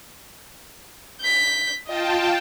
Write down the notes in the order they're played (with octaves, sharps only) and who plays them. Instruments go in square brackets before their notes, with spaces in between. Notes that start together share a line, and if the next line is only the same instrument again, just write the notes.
[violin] G6 B6
[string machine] F4 G5 A5 [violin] D#5